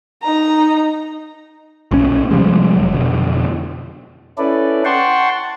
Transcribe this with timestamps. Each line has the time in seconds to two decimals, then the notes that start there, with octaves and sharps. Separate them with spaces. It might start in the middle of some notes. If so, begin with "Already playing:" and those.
0.23 D#4 A#5
1.91 B1 A#2 C#4
2.31 C3 F3 G3 G#3
2.76 E1 F#3
2.94 F2 B2 D3
4.38 C#4 E4 A4 B4 D5
4.85 F#5 G5 A5 C6 C#6